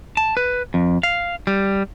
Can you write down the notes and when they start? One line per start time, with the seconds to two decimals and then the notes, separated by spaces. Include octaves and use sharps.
0.17 A5
0.37 B4
0.74 F2
1.03 F5
1.47 G3